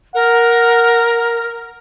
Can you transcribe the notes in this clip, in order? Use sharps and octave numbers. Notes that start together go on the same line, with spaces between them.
A#4 F#5